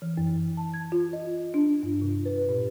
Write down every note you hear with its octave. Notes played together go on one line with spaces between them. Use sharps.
E3
F#2
A5
G#6
F4
D#5
D4
G2
C3
B4
A#2